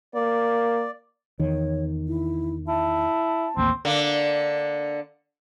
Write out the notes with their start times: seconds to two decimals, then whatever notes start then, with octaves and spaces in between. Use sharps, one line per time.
0.14 A#3 D5
1.39 E2 D#3 C#5
2.08 E4
2.68 E4 A5
3.57 A1 D#2 A#3 C4
3.85 D3 A#3